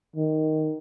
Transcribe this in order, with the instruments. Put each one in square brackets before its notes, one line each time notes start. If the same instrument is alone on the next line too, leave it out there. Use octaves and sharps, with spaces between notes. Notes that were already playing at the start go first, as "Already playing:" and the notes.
[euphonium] D#3